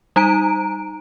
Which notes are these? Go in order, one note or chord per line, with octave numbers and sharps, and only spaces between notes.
G3 D#4 A#5 D7